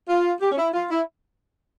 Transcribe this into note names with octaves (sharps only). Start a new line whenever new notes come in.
F4
G4
C#4
E4
F4
E4